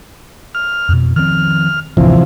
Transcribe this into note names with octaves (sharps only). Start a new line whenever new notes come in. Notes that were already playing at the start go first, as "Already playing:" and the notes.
F6
F2 B2
D#3 F3 C4 F6
A1 D2 G2 C3 E3 F3